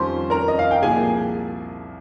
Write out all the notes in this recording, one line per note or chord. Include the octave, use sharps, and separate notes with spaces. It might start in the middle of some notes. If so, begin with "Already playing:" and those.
Already playing: F2 D#3 G3 C#4 F4 C5 C6
A#4 A#5
D#5
F5
G5
C2 A#2 F3 A#3 G#4 G#5